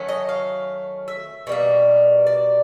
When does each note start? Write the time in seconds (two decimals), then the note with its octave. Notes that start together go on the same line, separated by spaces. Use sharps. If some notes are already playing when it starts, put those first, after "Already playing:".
Already playing: D#3 F#3 A3 C#4
0.09 D#5
0.29 F5
1.08 E5
1.47 B2 G3 A#3
2.27 D5